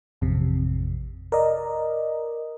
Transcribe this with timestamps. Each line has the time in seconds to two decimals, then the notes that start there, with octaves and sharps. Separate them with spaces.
0.21 A1 F2 C3
1.32 A#4 D5 D#5